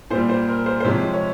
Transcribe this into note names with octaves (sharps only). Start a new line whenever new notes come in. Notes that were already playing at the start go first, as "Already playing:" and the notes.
A#2 G3 C5
C5
A#4
C5
C5
C3 F3 G#3 C#5
C#5